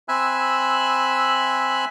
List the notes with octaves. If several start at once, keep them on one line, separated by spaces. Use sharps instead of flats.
C4 E5 G#5 B5 E6 F#6